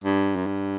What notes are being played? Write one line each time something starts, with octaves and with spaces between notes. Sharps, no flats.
G2
F#2
G2